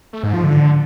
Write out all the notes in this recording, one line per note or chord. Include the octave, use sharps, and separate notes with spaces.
A3
G#2
F3
D3